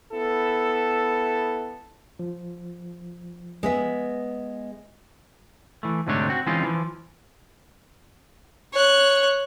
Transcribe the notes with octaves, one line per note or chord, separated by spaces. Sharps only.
B3 E4 A4
F3
G#3 B3 E5
E3 A3
D2 G#2 C3 A3 D4 C#5
C4 F#4
E3 G#3 C4 C#4 D#4 F4
E3 F3
C#5 F#6